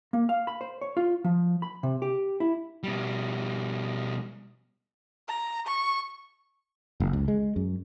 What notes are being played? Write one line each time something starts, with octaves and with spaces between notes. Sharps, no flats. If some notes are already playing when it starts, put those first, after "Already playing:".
A#3
F5
B5
C5
C#5
F4
F3
B5
C3
G4
E4
B2 G3
A#5
C#6
F#1
C#2
G#3
F#2